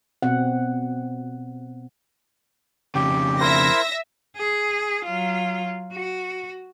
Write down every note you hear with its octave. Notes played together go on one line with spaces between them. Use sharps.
B2 C4 F#5
F2 C#3 G4 G5
E4 A#4 C5 E5 A#6
G#4
F#3 F4
F#4